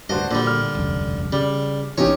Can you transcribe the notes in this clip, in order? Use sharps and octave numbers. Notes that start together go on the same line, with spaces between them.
D2 G2 D4 F#4 C5 D#5
A#2 D3 G3
F6
E1 C2 F#2
C#3 G3
B1 B2 E3 C#4 D#4 G4 C#5